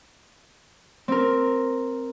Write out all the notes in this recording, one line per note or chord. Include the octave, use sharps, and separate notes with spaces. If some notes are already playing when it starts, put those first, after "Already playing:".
C4 A#4